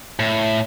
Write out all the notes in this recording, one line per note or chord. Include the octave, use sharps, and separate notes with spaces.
A2